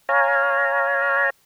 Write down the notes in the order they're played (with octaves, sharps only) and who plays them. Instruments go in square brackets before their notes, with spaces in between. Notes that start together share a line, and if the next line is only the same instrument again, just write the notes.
[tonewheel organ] C#5 F5 G#5 A#5